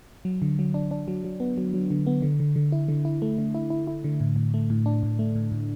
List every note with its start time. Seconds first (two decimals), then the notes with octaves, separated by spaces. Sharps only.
0.25 F#3
0.42 D3
0.59 F#3
0.74 D4
0.91 D4
1.08 F#3
1.24 F#3
1.40 B3
1.58 F#3
1.74 F#3
1.91 D3
2.07 B3
2.22 D3
2.40 D3
2.56 D3
2.72 E4
2.89 D3
3.05 E4
3.22 A3
3.38 D3
3.55 E4
3.70 E4
3.87 E4
4.04 D3
4.20 A2
4.36 A2
4.54 A3
4.70 A2
4.86 D4
5.03 A2
5.19 A3
5.36 A2
5.52 A2